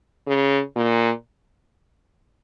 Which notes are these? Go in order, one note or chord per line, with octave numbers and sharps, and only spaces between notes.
C#3
A#2